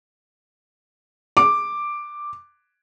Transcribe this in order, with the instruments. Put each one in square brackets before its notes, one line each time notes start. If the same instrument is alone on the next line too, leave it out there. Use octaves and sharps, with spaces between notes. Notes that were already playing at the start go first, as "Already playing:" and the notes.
[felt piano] D6